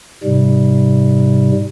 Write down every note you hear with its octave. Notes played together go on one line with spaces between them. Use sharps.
G#2 C3 G3